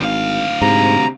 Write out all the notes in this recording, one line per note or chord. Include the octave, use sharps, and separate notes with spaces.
G#1 D2 F5
G#2 C3 A#5